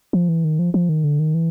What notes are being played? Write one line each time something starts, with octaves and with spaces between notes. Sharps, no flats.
F3
E3
D#3
F3
F3
D#3
D3
D#3
E3